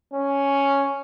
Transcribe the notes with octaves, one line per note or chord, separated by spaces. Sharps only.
C#4